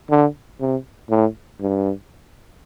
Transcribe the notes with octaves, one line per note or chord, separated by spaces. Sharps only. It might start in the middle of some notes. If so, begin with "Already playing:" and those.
D3
C3
A2
G2